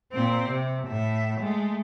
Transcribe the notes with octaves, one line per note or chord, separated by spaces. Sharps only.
A#2 C4
C3
A2 E5
G#3 A3